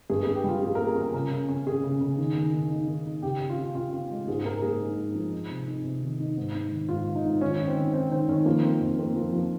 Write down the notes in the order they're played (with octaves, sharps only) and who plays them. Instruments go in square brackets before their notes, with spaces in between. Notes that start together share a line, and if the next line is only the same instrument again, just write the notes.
[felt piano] G2 [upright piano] G#4
[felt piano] G2 [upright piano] G#4
[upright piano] G4
[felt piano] G3 [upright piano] F4
[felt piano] C#4 [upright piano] G#4
[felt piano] A#3 [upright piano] A#4
[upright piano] G#4
[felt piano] C#4
[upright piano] A#4
[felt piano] C#3 [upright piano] A#4
[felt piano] C#3
C#4
[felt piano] C#4 [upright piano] G#4
[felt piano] C#3
C#3
D#3
D#3
D#3
D#4
D#3
D#4
[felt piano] C#3 [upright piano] G4
[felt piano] C#4
[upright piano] F4
[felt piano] C#4
[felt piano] C#3 [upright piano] F4
[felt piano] C#4
G#3
[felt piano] G#2 [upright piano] G#4
[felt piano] G#2 [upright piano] A#4
[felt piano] A#3 [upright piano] G#4
[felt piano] D#4
G#2
F3
D#4
C3
D#4
C3
D#3
D#4
G#2
G#2
D#3
[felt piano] G#2 [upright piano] F4
[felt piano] D#3
[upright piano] D#4
[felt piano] G#2
[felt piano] D#3 [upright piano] C#4
[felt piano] D#4
[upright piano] C4
[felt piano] D#3
[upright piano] C4 [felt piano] D#4
[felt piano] D#3 [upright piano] C4
[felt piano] D#3 [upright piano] C#4
[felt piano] F3 [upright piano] A#3
[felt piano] C4
F2
[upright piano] A#3 [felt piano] C4
[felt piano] F3
F3